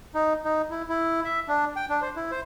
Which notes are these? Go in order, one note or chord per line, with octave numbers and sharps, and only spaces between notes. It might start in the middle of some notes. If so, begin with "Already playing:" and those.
D#4
D#4
E4
E4
E5
D4
G5
D4
C5
E4
C5